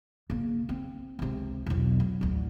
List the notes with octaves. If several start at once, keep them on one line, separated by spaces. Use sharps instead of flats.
C#3 A#3
C4
C#2 C3
E1 B1
F#3
A1 D2